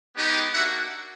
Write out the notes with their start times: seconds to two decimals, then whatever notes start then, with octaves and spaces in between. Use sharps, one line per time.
0.15 G#3 B3 D#4 G4
0.52 A#3 D4 F#4 E5 F#5